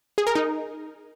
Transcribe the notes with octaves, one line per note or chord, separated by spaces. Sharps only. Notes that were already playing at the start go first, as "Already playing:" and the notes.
G#4
A#4
D#4